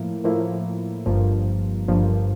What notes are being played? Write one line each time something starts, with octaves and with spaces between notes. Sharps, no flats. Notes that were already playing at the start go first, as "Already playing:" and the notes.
Already playing: A2 F3 A#3 E4
A2 F3 A#3 E4
G1 G2 F3 A#3
G1 G2 F3 A#3